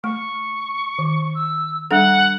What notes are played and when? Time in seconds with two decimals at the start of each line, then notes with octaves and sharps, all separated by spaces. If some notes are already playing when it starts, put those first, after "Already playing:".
0.04 A3 C#6
0.98 D#3
1.35 E6
1.91 G3 D4 A4 F#5